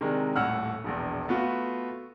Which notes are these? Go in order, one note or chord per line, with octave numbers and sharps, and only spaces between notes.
C3 D#3 G#3 D4 A#4
D#1 A2 F#5 E6 F6
E1 A#1 E2
A3 B3 F4 F#4